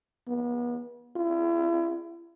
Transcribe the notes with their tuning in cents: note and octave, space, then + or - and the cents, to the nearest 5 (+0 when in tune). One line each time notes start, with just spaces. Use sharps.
B3 -35
E4 +40